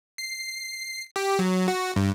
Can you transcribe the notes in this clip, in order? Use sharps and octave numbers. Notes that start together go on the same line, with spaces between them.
C7
G4
F#3
F#4
G2